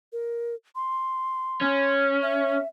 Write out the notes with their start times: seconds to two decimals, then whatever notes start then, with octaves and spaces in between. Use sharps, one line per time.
0.13 A#4
0.76 C6
1.62 C#4
2.23 E5